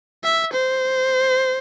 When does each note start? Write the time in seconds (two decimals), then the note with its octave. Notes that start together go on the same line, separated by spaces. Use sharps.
0.24 E5
0.53 C5